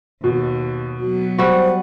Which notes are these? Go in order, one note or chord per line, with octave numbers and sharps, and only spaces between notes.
D#2 B2
F#3 B3 F#4
G3 F#4 C5